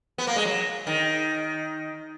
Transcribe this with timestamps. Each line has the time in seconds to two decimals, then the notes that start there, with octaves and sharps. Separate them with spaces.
0.18 B3
0.27 A#3
0.36 G#3
0.45 F#3
0.87 D#3